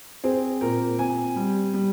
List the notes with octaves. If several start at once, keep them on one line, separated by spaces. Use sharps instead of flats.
C4 G#4
A#2 A#4
C4 G#5
G3
G3